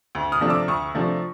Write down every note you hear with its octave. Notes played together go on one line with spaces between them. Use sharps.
D2
D#6 F6
C3 F3 A3 D4
D6 E6
D2 C#6 D#6
C3 F3 A3 D4